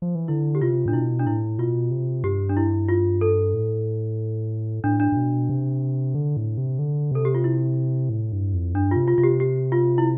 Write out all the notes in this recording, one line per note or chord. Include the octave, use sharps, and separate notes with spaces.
F3
E3
D3 E4
G4
C3 F4
A2 D4
B2 E4
D4
A2 E4
B2 F4
C3
G2 G4
D4
E4
F4
A4
A2
A2 D4
D4
A2
B2
C3
D3
A2
C3
D3
C3 A4
G4
F4
E4
A2
G2
F2
G2 D4
C3 F4
F4
C3 F4
G4
G4
F4
E4